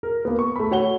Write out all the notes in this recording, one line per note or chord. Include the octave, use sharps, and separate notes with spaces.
A#4
A#3 B3
C#6
A3 B5
F#4 C#5 F#5 G7